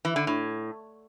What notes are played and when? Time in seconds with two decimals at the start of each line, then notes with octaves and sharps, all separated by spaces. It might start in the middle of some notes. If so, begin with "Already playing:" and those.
0.05 E3
0.16 D3
0.27 A2